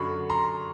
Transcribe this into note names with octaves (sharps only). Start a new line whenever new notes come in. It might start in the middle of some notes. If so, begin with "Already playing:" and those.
Already playing: F#2 D3 F#3 B5 C#6
A#5 C6